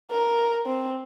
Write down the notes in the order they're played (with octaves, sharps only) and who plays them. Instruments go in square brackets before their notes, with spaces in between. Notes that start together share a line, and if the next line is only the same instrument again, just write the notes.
[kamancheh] A#4
C4